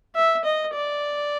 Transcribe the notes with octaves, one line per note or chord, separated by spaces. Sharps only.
E5
D#5
D5